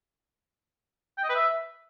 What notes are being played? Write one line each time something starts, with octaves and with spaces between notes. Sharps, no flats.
G5
D#5
B4
E5